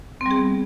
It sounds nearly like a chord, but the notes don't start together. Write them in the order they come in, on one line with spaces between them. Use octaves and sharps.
C4 G3 G#4 B3